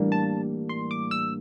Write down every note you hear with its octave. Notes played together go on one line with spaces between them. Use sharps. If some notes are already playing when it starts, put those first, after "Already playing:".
Already playing: A2 E3 G3 A#3 D4
A5
C6
D6
E6